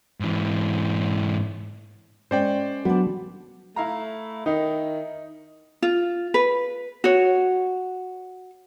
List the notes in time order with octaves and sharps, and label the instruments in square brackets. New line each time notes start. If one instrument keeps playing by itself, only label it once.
[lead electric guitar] G#2 E3
[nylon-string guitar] G#3 C#4 [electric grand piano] C5 D5 G5
[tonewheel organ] F#3 [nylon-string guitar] B3 D4
[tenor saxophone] A3 [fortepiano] E4 F5 A#5
[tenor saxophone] D#3 [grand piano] D#4
[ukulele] F4
B4
F#4 C#5